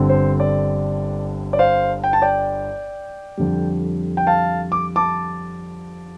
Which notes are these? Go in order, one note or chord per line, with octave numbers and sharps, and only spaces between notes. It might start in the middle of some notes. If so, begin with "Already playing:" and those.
Already playing: G1 G2 D3 G3 C4
C5
D5
D5
C5 F5
G5
A5
D5 G5
F2 D3 G3
G5
F5 A5
D6
A5 D6